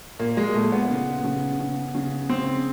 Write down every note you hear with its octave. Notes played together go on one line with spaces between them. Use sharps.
A#2 A#3
G#3
A#2 A3
B3
C#3
C#3
C#3
C#3
C#3 C4